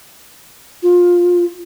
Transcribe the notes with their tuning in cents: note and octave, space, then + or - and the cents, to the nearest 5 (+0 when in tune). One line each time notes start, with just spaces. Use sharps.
F4 +20